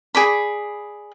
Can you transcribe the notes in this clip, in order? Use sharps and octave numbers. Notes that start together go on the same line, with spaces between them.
G#4 D5 B5